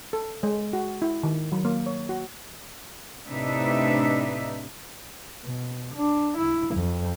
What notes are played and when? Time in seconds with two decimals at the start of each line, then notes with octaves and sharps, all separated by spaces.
0.13 A4
0.43 G#3
0.73 F#4
1.02 E4
1.23 D#3
1.52 F#3
1.65 A#3
1.86 C#5
2.09 F#4
3.27 A2 C3 D4 D#4 B4 E5
5.43 B2
5.95 D4
6.37 E4
6.75 F2